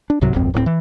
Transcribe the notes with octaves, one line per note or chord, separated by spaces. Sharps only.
D4
C2 G#2 C3 F#3
D#1 G#1 F2 C4
D1 A2 A3 C4
E3